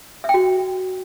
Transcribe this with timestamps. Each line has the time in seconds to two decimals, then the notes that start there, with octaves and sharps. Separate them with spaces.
0.24 E5
0.29 G5
0.34 F#4